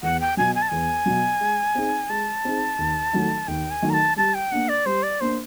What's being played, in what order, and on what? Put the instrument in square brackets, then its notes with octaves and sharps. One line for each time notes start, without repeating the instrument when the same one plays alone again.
[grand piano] E2 [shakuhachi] F#5
[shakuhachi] G5
[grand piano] B2 F#3 [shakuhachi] G#5
[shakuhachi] G#5
A5
[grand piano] E2 [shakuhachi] G#5
[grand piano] B2 F#3
G#3
C4 D#4 G#4
[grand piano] G#3 [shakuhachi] A5
[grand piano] C4 D#4 G#4
D#2
D#3 F#3 A3
[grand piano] D#2 [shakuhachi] G5
[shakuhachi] G#5
[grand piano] D#3 F#3 A3
[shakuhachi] A#5
A5
[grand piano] G3 [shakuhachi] A5
[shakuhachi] G5
[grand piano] A#3 D4 [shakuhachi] F#5
[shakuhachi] D5
[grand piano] G3 [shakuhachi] C5
[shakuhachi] D5
[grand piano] A#3 D4 [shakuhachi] C5